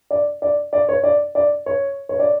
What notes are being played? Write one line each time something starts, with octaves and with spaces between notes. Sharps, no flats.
D5
D5
D5
C#5
D5
D5
C#5
C#5
D5